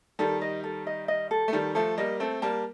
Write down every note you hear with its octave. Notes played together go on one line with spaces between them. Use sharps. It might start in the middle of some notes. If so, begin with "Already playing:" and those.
D#3 G3 A4
D#5
A4
D#5
D#5
A4
A3
D#3 G3 A4
F3 A3 A4
G3 A#3 D#5
A3 C4 A4
G3 A#3 A5